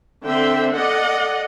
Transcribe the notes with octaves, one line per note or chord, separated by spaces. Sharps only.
D3 C4 E5 G5
A4 D5 D#5 F#5